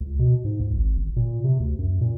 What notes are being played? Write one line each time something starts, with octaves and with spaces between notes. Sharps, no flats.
C#2
B2
G#2
C#2
G#1
G1
A#2
C3
D2
F#2
A#2